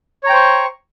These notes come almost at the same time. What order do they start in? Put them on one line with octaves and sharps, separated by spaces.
C#5 A#5 G5 C5 C#6